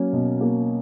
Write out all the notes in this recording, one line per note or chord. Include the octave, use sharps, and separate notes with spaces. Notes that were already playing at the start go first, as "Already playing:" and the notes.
Already playing: F#3 A#3 C#4
B2
A#3